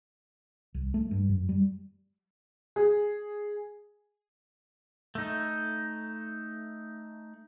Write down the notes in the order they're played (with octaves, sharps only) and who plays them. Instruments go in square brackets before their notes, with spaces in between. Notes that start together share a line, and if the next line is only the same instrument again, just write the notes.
[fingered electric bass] C2
A3
G2
F#2
G3
[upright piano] G#4
[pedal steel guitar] A3 D#4